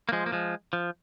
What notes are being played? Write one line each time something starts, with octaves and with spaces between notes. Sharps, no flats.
A#3
F3 G#3
A#3
F3 G#3
F3